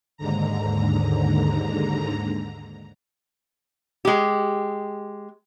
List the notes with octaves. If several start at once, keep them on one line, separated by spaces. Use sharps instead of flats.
D#2 G#2 D3 A#5
G#3 G4